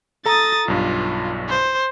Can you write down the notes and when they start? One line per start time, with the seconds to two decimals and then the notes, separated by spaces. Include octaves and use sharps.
0.26 A4 A#5 D#6 A6
0.68 B1 G2 F4
1.49 C5